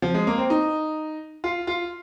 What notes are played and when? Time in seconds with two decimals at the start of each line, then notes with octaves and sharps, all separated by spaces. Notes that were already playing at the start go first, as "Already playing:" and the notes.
0.02 F3
0.14 G#3
0.27 A#3
0.38 C4
0.50 D#4
1.44 F4
1.67 F4